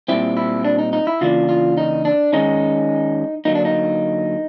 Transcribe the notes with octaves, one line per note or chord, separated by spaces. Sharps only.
A#2 G3 C4 E4
E4
D4
D#4
D#4
E4
C#3 E3 G3 A#3 D4 F4
F4
D#4
D4
D#3 G#3 C#4 D#4
D3 F#3 A#3 D#4
D4
D#4